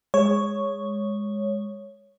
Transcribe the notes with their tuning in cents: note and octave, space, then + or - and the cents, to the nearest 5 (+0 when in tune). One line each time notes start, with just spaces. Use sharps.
G#3 -10 C#5 +0